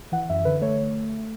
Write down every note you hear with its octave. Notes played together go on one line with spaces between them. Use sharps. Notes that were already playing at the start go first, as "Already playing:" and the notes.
E3 F#5
F#2 E5
D3 B4
A3 C#5
C#5